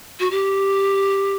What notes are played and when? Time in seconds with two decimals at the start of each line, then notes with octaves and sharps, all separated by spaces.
0.19 F#4
0.30 G4